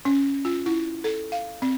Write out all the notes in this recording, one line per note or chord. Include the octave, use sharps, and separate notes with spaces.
C#4
F4
E4
A4
F5
C4